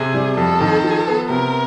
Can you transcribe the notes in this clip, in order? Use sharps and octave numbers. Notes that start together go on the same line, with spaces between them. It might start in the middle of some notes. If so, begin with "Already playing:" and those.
Already playing: C3 G#4
G3
F2 A4
D#3
F3
B3
C3 A#4